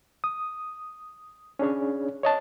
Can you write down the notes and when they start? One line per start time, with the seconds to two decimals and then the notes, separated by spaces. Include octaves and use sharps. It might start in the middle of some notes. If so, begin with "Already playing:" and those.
0.24 D#6
1.59 C#4 D4 G#4 C#5
2.23 C#5 D#5 A5